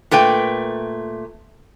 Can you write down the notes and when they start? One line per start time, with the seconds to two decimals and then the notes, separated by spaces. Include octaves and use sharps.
0.11 A#2 A3 B4 G5